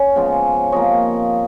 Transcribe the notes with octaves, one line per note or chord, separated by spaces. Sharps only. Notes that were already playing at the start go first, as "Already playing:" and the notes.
Already playing: C#4 C#5
C#3 F3 G#3 B3
C3 F3 A#3 C#5 D#5